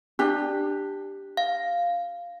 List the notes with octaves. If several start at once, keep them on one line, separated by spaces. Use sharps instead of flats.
D4 G4 F#6
F5